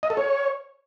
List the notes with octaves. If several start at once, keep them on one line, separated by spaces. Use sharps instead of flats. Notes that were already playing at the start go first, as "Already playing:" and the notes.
D#5
A4
C#5